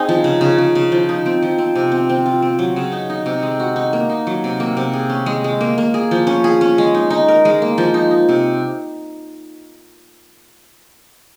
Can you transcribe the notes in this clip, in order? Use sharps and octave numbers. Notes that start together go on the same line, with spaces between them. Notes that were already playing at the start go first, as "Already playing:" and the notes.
Already playing: C4 D#4 G#4
F3
C#3
C#3
C#3
C#3
F3
D#4
C4
F3
C4
C3
C4
C4
F4
C4
F#3
C#3
D#4
D#4
C3
G#3
F#4
D#4
A#3
D#4
F#3
C3
A#3
C3
G#4
C#4
G#3
G#3
A#3
A#3
G#4
F3
C#4
G#4
C#4
G#3
D#4
D#4
A#4
G#3
A#3
F3
D#4
D#4
C3